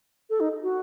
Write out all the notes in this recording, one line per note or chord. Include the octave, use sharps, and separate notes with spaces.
A4
D#4
F#4